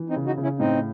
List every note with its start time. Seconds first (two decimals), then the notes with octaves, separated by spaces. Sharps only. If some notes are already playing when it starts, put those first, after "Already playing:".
Already playing: E3
0.10 C4 D#4
0.16 C#3
0.26 D#4 F#4
0.37 C#3
0.43 C#4 E4
0.59 A2 C4 D#4